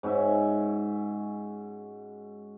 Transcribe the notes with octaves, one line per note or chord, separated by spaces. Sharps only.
G#2 C#4 F#4 E5